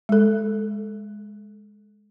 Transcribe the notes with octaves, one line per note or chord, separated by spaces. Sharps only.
G#3 A4